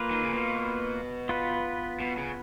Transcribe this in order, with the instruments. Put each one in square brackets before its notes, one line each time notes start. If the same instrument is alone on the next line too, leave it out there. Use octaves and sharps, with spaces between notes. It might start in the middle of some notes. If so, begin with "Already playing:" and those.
Already playing: [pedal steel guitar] A#3 F4 B4
[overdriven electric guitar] D#3
C#3
B2
[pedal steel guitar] B3 F4 B4
[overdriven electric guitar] B2
C#3